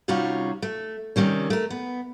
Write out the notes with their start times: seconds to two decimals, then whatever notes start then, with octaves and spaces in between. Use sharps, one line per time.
0.08 C3 G3 C#4 D#4 F4 F#4
0.62 A3
1.16 C3 D#3 G3 C#4
1.50 A3 A#4
1.70 B3